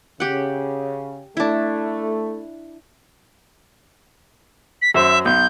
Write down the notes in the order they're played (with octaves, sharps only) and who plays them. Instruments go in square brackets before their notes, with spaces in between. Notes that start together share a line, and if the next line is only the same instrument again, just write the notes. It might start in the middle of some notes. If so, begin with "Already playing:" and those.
[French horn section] C#3 [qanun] G4 F#5
[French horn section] A3 [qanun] D4 E4
[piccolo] B6
[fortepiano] F#2 C5 [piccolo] E5
[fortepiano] B1 [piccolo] G6